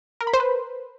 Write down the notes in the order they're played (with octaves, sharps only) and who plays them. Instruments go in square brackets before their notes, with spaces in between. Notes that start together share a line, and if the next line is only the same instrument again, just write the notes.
[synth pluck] A#4
B5
C5
B4